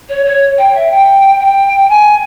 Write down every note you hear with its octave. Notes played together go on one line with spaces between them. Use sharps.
C#5
C#5
G5
E5
G5
G5
G#5